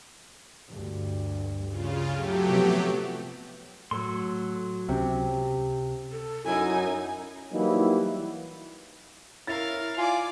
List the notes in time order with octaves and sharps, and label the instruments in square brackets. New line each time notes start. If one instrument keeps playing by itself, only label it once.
[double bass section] D2 G2
[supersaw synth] C#3 F4
F#3 A3 G4
[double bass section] C3 F3 B3
[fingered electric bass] A2 [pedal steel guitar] F#3 A4 C6
[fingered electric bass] C#2 C4 C#4 [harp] C3
[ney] A4
[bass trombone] F#2 [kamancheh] D#4 G#5 [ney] E4
[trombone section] E3 F#3 G3 A#3 D#4 E4
[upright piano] E4 C#5 A6 [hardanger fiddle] A#4 F5
[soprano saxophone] F4 [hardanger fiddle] D5 D6 [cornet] G#5